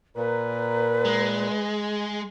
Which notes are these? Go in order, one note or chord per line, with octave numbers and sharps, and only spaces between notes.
A#2 A#4 B4
G#3